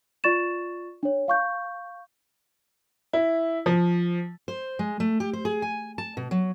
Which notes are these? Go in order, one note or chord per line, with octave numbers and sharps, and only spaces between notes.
F4 D5 C#6 A6 E7
D4 C#5
F5 C#6 G6
E4
F3
C5
G#3
A3
G4
C5
G#4
G#5
A5
B2
F#3